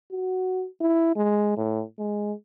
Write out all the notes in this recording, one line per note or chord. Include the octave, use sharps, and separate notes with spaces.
F#4
E4
G#3
A2
G#3